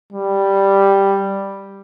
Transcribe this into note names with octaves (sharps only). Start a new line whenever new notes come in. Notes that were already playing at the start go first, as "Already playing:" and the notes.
G3